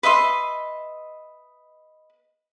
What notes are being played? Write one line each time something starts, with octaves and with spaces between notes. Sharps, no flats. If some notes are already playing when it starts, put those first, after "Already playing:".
B4 D#5 E5 C6